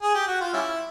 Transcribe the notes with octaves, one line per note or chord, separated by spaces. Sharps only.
G#4
G4
F#4
F4
G3 C#4 E4